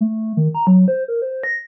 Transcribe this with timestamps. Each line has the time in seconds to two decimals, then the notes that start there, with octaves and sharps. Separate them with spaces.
0.01 A3
0.37 D#3
0.55 A#5
0.67 F#3
0.88 C5
1.08 A#4
1.22 C5
1.44 A#6